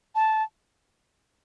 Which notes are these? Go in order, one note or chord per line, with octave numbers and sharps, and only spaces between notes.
A5